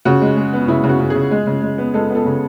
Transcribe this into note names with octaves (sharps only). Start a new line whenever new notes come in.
C#3 F#4
G#3
G#3
B3
C#3 E4
C#3
F#4
C#3
G#4
C#3
G#3
C#3
G#3
B3
G#3 A4
B3
A4
C#3